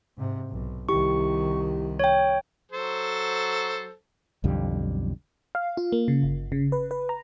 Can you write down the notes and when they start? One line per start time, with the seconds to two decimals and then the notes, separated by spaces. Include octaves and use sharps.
0.16 G#2 C3
0.50 B1
0.89 C2 D#3 E4 G4 C#6
1.99 C#5 G5
2.72 F#3 A4 C5
4.44 B1 F2 D3 G3
5.55 F5
5.77 F4
5.92 A#3
6.08 C#3
6.23 G1
6.52 C#3
6.72 B4
6.91 B4
7.09 A#5